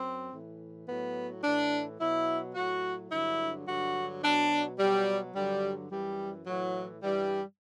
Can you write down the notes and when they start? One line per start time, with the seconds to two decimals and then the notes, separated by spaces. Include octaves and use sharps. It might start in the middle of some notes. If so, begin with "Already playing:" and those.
Already playing: F#2 F#3 C4
0.31 A2 E3
0.87 A2 F#3 B3
1.43 A2 E3 D4
1.99 B2 F#3 E4
2.55 A2 F#3 F#4
3.10 G2 D3 F#3 E4
3.66 G2 D3 F#3 F#4
4.23 B2 F#3 D4
4.78 B2 F#3 G3
5.34 G2 D3 F#3 G3
5.90 F#2 E3 G3
6.46 A2 E3 F#3
7.02 G2 E3 G3